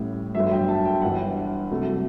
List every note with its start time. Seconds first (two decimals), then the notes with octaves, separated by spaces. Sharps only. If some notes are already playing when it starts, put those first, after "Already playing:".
Already playing: A1 A2 G3
0.35 G1 G2 F#3 A3 E5
0.51 G5
0.69 A5
0.85 G5
1.02 G1 G2 E3 F#5
1.70 C2 C3 F#3 A3